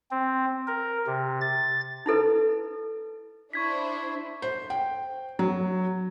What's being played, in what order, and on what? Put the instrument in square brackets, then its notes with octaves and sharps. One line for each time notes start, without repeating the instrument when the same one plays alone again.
[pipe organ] C4
A#4
C3
A6
[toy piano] D#4 E4 A4 B4
[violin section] D4 E4 C5 [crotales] C#6 G#6 B6
[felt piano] C5
G5
F#3